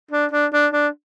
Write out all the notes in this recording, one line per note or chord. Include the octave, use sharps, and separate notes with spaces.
D4
D4
D4
D4